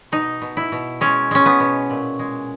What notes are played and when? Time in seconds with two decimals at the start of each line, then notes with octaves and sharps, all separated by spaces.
0.12 B2 D#4
0.42 B2
0.57 E4
0.72 B2
1.01 G#3 C#4
1.31 G#3 C#4
1.46 B3
1.60 B2
1.90 A#2
2.19 G#3